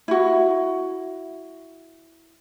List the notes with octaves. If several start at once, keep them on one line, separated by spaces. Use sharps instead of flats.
E4 F#4